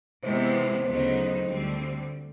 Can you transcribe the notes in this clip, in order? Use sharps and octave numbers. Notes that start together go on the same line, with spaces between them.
C3 E3 G#3 B3 C5
D2 C#3 F#3 B3 D#4 C5
D2 D3 G3 C4